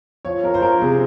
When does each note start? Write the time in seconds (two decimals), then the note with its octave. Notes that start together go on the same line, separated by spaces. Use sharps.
0.25 F3 C#5
0.43 F3 A#4
0.54 C5
0.62 F3 A#4
0.82 C3 G#4